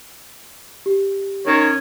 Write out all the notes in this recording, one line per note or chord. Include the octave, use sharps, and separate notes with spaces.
G4
D#3 C#4 C#5